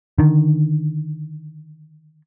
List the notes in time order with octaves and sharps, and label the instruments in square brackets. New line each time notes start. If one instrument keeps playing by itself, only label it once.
[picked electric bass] D3 D#3